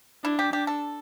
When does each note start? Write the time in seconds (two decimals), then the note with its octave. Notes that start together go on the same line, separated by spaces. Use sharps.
0.24 D4 E4
0.39 G4
0.53 D4 G4
0.67 A4